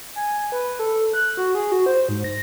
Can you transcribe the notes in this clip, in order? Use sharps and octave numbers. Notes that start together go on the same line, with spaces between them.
G#5
B4
A4
F#6
F#4
G#4
F#4
C5
G#2
A#6